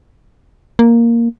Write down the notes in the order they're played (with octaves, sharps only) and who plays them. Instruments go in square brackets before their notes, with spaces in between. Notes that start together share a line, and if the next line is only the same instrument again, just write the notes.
[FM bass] A#3